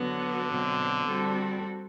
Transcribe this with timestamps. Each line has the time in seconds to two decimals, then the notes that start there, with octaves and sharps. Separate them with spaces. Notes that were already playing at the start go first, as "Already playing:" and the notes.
Already playing: D3 F#3 B3 F#4
0.48 B2 F#3 C4 F#4
1.06 G3 C4 F#4 A4